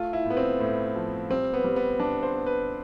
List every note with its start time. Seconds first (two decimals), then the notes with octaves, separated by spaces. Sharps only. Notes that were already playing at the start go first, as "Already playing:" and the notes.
Already playing: A3 F4
0.13 E4
0.25 A2
0.30 B3
0.37 C4
0.60 A2
0.95 F3
1.30 G3 C4
1.54 B3
1.64 G3
1.76 B3
2.00 G3 D4
2.23 C5
2.35 B3
2.46 B4